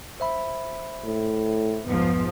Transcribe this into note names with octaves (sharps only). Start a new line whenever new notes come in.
C5 E5 B5
A2
B1 F2 G#2 F3 B3